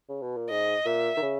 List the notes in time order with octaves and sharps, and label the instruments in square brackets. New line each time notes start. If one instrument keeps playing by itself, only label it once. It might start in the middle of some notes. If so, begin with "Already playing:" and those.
[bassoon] C#3
B2
A#2
[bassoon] G#2 [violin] D#5
[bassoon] A#2 [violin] E5
[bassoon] D#3
C#3